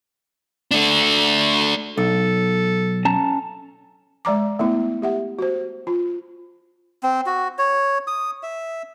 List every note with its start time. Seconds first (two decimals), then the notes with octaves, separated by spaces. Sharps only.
0.71 A3 D4
1.97 B1 A4
3.05 C#4 A5 A#5
4.25 G#3 D5 A#5 D6
4.59 A3 B3 E4
5.02 G4 E5 F#5
5.39 F#4 C5
5.87 F4
7.03 C4
7.26 F#4
7.59 C#5
8.07 D#6
8.43 E5